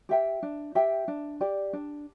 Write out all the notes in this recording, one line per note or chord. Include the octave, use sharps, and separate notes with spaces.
G4 E5 G5
D4
G4 E5 G5
D4
G4 D5
D4